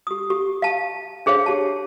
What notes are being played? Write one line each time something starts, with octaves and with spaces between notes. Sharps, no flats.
G4 D#6
G4
F5 A5
D4 G#4 C5 C#5 F5
G4 A5